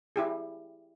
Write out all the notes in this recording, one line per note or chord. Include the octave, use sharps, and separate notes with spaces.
E4 G4 G#4